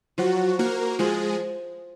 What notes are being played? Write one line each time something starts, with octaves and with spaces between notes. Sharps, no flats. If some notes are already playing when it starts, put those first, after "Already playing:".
F3 F#3 F#4
A#3 F#4 A#4
F3 G#3 G#4